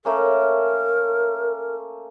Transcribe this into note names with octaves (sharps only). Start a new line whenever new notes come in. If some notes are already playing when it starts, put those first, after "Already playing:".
A3 A#3 C#4 A#4